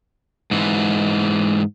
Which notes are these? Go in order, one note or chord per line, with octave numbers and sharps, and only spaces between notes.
G#2 E3